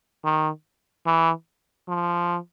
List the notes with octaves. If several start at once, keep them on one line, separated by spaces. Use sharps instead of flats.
D#3
E3
F3